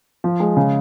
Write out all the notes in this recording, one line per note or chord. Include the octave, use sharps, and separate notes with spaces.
F3
G#3
C#3